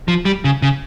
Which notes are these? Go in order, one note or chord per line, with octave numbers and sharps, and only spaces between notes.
F3
G3
C#3
C#3